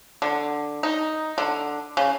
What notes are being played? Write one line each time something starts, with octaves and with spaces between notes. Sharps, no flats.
D3
D#4
D3
C#3